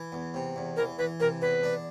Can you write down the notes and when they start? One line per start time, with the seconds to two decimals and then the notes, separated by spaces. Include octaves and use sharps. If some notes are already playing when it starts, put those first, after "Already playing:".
Already playing: E3
0.12 E2
0.34 C3
0.56 E2
0.77 E3 A#4
0.98 E3 B4
1.20 C3 A#4
1.42 E2 B4
1.64 D4